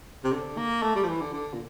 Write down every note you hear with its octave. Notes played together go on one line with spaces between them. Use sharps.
C3
D3
A#3
A3
G3
F3
E3
D3
D3
A#2